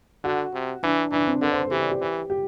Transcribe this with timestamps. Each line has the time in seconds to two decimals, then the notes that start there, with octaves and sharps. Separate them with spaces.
0.24 D3 F#4
0.53 C3
0.83 E3 D4
1.12 E3 D4
1.27 C4
1.41 D3 B4
1.52 C5
1.62 A4
1.71 E3 G4
1.81 D5
1.90 G4
2.01 E3
2.30 G4